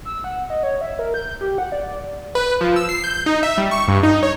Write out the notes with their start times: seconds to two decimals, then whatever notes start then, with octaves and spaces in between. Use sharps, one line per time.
0.05 E6
0.24 F#5
0.50 D#5
0.63 C#5
0.81 E5
0.99 A#4
1.14 G6
1.41 G4
1.58 F#5
1.72 D5
2.35 B4
2.61 F3
2.76 E6
2.89 C7
3.04 G6
3.26 D#4
3.43 E5
3.58 G3
3.71 C#6
3.88 G2
4.03 D#4
4.23 C#5